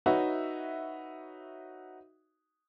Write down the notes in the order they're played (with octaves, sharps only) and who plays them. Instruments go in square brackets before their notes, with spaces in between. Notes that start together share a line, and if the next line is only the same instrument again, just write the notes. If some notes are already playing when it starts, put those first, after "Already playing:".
[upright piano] D#4 F#4 B4 C#5 E5